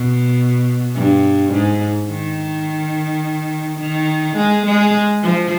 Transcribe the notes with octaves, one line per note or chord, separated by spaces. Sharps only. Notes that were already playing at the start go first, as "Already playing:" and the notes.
Already playing: B2
G2
G#2
D#3
D#3
G#3
G#3
F3